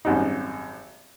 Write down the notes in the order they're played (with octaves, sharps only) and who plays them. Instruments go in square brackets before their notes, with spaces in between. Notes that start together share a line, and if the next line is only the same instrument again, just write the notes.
[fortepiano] G#1 F#2 G3 D#4